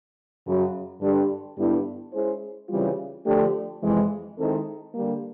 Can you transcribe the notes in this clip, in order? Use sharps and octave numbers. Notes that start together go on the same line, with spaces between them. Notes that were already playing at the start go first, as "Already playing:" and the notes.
F#2 C#3 F#3
G2 D3 G3
G2 D3 G3 B3 E4
G#3 C#4 E4 G#4 C5
C#3 E3 G3 C4 F4
D3 F3 A3 D4 G4
F2 C3 E3 G#3
D#3 G#3 C4 E4 A4
D3 G3 A#3